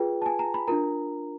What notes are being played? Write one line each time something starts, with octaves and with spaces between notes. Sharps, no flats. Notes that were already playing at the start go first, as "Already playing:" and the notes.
Already playing: F4 G#4 B4 G5
A5
G#5
A#5
B5
D4 F4 A#4 A#5